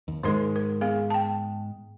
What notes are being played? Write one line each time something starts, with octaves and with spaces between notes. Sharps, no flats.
D#2
G#2 D#3 G#3 D#4 A#4
A#4
B3 G#4 F5
G5 A5